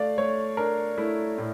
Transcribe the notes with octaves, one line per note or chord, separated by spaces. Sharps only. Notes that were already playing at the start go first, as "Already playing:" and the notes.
Already playing: A3 D4 D5 F5
A3 C#5
D4 A#4
A3 E4
A2